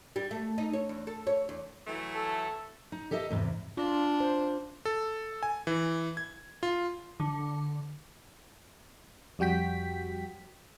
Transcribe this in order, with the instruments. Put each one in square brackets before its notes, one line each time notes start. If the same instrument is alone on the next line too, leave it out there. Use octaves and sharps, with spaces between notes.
[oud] G3
A3
D#4
C#5
E2
A4
C#5
E2
[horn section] E3 F#3 A3
[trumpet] A4
[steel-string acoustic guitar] D#4
G4 A4 A#4 D#5 E5
E2 G#2 C3
[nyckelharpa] D4 [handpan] F4
[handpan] C5
[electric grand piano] A4
G#5
E3
G#6
F4
[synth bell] D3
[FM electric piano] F2 G3 F#4 G5 B6